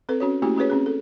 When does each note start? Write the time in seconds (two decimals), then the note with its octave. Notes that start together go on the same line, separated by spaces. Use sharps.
0.09 C4 A4 B4
0.20 C#4 F#4 C#5
0.42 A3 A#3 C#4 E4 F#4 G4
0.56 C#4 F#4 G#4 B4 C#5
0.70 C4 C#4 G#4
0.86 A4